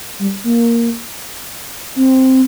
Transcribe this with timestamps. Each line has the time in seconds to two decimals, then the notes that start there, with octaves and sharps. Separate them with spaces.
0.19 G3
0.44 A#3
1.96 C4